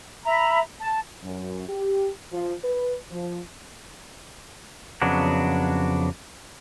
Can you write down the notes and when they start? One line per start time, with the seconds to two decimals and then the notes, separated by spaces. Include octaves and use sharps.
0.25 E5 A#5 B5
0.80 A5
1.23 F#2
1.68 G4
2.32 F3
2.64 B4
3.10 F3
5.02 F2 C#3 F#3 B3 D4